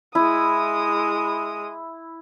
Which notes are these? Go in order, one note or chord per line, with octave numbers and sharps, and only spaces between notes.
G#3 E4 D#6